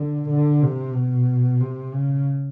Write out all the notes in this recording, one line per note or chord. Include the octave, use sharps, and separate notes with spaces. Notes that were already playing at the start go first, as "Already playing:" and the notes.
Already playing: D3
D3
C3
B2
C3
C#3